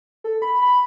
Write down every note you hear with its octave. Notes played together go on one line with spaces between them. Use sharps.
A4
B5
B5